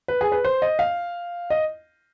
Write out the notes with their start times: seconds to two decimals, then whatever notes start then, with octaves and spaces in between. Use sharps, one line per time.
0.08 B4
0.21 G#4
0.32 B4
0.45 C5
0.62 D#5
0.79 F5
1.50 D#5